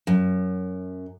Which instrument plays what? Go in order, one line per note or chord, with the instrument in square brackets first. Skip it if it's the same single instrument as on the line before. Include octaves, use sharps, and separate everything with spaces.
[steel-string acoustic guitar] F#2